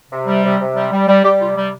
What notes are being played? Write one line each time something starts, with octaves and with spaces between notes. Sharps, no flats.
C3
G3
C3
C3
G3
G3
G3
G3 G4
C3 F4
G3